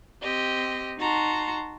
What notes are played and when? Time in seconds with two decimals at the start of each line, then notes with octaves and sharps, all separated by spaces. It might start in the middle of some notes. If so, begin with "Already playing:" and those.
0.24 C4 G4 D#5
0.99 D#4 F#4 A5 A#5 C6